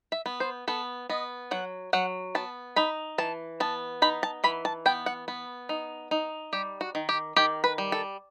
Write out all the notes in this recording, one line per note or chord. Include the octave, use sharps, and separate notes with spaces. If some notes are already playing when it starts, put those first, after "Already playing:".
E5
B3
C5
B3 A4
B3 D#5
F#3 F#5
F#3 F#5
B3 A5
D#4 B5
E3 A5
B3 A5
D#4 B5
A5
E3 B5
A5
B3 G5
F#5
B3
D#4
D#4
G3 G4
F#4
D#3
G4
D#3 G4
B4
G3
A4